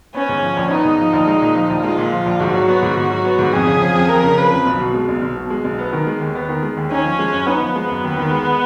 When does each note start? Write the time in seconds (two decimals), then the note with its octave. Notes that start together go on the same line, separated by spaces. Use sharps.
0.15 B3 C#4
0.29 G#2
0.43 F3
0.57 A#1
0.71 B3 D#4
0.85 G#2
0.99 F3
1.13 A#1
1.27 G#3
1.42 A#2
1.55 F3
1.70 A#1
1.84 G#3 F4
1.98 A#2
2.12 F3
2.26 A#1
2.40 G#2 F#4
2.54 F#3
2.69 B3
2.82 G#2
2.97 G#2
3.10 F#3
3.25 B3
3.39 G#2
3.53 F2 G#4
3.67 C#3
3.81 F3
3.95 F2
4.09 F2 A#4
4.23 C#3
4.38 F3 B4
4.52 F2
4.66 B1
4.80 B2
4.94 G#3
5.08 B1
5.22 B1
5.36 B2
5.50 G#3
5.64 B1
5.79 B3
5.93 D#3
6.07 G#3
6.21 D#2
6.35 B3
6.49 D#3
6.63 G#3
6.77 D#2
6.91 C#4 D#4
7.05 F3
7.19 G#3
7.33 F#2
7.47 B3 D#4
7.62 F3
7.76 G#3
7.89 F#2
8.04 D#2
8.18 D#3
8.32 G#3